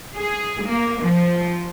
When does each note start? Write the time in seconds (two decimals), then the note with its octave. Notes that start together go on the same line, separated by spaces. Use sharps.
0.16 G#4
0.64 A#3
1.03 F3